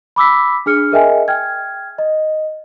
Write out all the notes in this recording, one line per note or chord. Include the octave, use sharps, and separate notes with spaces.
B5 D6 E6 B6
D4 G#4 F6 C#7
G#4 A#4 D#5 E5 G5 G#5
G5 F6 G#6
D#5